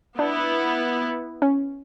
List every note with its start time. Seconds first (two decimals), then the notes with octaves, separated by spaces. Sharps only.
0.18 B3 D4 E4 B4
1.42 C#4